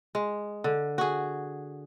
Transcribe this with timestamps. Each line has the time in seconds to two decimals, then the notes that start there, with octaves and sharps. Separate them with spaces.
0.15 G#3
0.64 D3
0.98 F#4 G#4